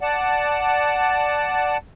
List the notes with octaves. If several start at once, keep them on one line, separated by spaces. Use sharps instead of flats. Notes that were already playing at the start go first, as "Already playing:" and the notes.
D5 F#5 A5